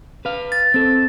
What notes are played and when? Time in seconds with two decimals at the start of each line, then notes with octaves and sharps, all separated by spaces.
0.25 B4 F5
0.52 A6
0.74 C4 A4